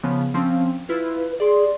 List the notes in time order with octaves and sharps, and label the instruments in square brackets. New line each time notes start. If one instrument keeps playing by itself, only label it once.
[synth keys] C#3 F3 B3
F3 C4 C#4
[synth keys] E4 F4 [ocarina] B4
[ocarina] G#4 [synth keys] D5 C6